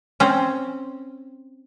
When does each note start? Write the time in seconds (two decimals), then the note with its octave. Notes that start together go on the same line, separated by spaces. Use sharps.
0.20 C4 C#4